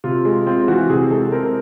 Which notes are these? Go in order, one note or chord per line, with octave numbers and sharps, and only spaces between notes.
C3 F4
G#3
C4 F4
E3 F#4
C3 G#4
G#3 A4
C4 A#4